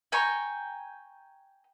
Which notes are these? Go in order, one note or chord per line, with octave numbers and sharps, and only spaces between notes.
G5 G#5 A#5 C#6